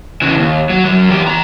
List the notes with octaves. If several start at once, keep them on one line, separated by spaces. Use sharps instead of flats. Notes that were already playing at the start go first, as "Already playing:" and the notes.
C#3 E3
D#2
F#3
F#2 F#3
E2 G4
E3 A#5